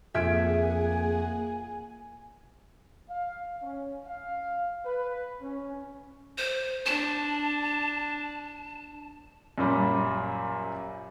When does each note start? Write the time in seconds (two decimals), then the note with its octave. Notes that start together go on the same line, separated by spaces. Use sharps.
0.14 F2 A#3 G#4 E5 F#5 G#5 G#6 D7
3.10 F5
3.63 C#4
4.07 F5
4.85 B4
5.41 C#4
6.38 C5
6.86 D4 A5
9.58 F#2 A#2 G3